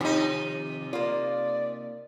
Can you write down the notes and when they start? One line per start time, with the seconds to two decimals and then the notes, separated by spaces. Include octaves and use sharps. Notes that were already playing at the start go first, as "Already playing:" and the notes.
0.01 C3 D#3 F3 D#4
0.93 A#3 F4 D5